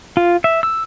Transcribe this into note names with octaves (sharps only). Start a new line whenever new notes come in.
F4
E5
E6